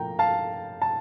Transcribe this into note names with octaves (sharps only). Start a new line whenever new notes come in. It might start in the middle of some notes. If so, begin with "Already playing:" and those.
Already playing: A2 F3 A#3 G5 A#5
F5 A5
A5